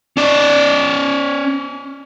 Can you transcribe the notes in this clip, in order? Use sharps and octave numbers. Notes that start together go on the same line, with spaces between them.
C#4 D5